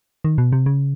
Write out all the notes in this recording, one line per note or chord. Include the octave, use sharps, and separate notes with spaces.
D#3
B2
C3
C#3